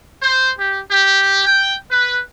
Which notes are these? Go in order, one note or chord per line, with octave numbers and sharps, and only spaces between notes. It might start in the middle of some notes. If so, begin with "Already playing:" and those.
C5
G4
G4
G5
B4